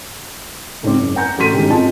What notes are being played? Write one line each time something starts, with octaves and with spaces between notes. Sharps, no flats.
C#2 G#2 C4 C#5 D6
F#1
F#5 G#5 A#5 G6 C#7
A1 F#4 A4 C6 B6 D#7
G1 G#2 D#3 C#4 G4 A4
C4 F4 G#4 D#5 A5